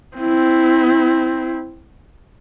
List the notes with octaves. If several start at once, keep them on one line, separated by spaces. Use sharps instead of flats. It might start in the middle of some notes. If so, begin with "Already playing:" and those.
C4 E4